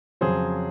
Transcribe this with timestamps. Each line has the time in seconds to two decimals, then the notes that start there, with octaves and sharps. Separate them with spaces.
0.21 F2 C#3 F#3 G#4 C5